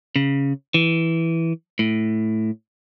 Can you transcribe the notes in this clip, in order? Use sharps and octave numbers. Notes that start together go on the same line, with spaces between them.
C#3
E3
A2